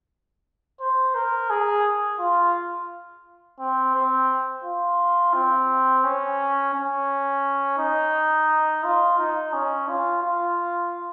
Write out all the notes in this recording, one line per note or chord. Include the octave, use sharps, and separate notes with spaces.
C5
A#4
G#4
F4
C4
C4
F4
C4
C#4
C#4
D#4
F4
D#4
C#4
F4
F4